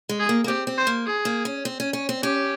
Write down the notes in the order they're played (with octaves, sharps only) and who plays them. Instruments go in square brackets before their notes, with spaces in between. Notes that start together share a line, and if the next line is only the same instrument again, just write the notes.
[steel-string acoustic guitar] G#3
[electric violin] G#4
[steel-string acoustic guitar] A#3
A#3
[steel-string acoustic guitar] C4 [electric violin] G4
[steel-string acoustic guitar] C4
[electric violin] C5
[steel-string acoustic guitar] A#3
[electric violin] G#4
[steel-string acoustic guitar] A#3
C#4
C4
C#4
C#4
C4
[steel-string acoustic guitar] C#4 [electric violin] G4